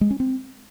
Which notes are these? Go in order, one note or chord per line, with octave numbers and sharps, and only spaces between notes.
G#3
C#4
C4